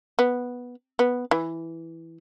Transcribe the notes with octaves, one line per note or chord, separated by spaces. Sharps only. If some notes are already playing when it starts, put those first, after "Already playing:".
B3
B3
E3